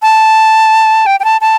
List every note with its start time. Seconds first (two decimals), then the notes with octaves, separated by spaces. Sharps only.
0.02 A5
1.06 G5
1.20 G5
1.24 A5
1.41 A5